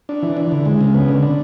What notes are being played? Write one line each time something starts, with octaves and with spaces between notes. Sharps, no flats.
D4
E3
D4
D3
G#3
C#3
B3
D3
D4